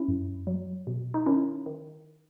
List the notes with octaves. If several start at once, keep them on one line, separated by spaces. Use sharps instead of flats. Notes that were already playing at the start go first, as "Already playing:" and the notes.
Already playing: C#4 E4
F#2
F#3
B2
D#4
D#3 C#4 E4
D#3